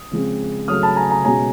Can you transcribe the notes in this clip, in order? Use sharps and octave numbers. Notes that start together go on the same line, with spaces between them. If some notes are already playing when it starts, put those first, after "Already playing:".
Already playing: D#6
C#3 F3 G#3 C4
C#3 F#3 A3 D#6 F6
A5 B5
G#5 A#5
G#5 A#5
B2 G#3 C#4 G#5 A#5